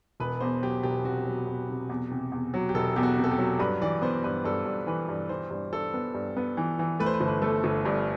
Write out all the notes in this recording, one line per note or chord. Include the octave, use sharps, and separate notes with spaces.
E1 B4
E2 C5
F#3 G4
E1 G4
C3 F#4
F#3
E2
C3
E2
C3
E2
F#3
G4
E1 A4
E2 G4
F#4
C3
A4
G4
F#3
G2 B4
E3 D5
B3 C5
G2 B4
G2 A4
G2
E3 B4
G2
E3 C5
G2
G2 A4
B3
G2
B3
E3
E3
A3 B4
C5
B4
G1 C5
B4
A3 A4
G1
G2